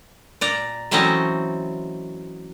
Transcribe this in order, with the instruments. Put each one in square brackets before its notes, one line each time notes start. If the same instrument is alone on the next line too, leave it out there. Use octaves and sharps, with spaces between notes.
[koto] A#2 D5 A#5
E3 F#3 A3 C4 C#4 D#5